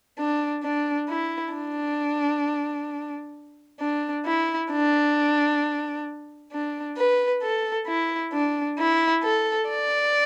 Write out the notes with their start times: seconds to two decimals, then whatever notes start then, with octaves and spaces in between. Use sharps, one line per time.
0.18 D4
0.63 D4
1.09 E4
1.54 D4
3.80 D4
4.25 E4
4.71 D4
6.52 D4
6.97 B4
7.43 A4
7.87 E4
8.33 D4
8.79 E4
9.23 A4
9.69 D5